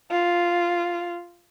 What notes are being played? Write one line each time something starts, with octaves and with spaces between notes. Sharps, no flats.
F4